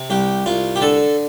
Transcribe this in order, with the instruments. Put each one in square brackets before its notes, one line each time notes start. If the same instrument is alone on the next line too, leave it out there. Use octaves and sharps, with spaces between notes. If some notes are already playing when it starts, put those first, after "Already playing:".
Already playing: [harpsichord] C3
C2 G4
C2 F4
G4
D3 A4